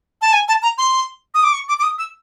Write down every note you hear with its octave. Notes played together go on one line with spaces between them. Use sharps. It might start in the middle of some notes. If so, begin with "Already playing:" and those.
A5
G#5
A5
A#5
C6
D#6
D6
C#6
D6
D6
D#6
E6